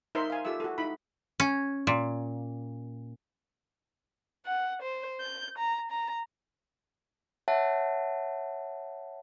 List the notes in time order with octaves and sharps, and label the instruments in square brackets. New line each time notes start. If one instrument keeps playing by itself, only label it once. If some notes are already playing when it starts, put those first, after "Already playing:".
[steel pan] D#4 A#4 C5 E5 C6
F5 G#5
F4 G4 A4 E5 E6
F#4 A4
D#4 E4 B5
[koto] C#4
A#2
[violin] F#5
C5
G6
A#5
A#5
[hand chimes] C#5 E5 F#5 A5